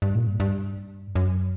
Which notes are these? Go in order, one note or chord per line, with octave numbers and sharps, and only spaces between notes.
G2
A#2
G2
G2
F#2